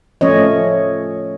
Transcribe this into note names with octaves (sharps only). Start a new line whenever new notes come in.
F3 A3 C#4 C#5 D#5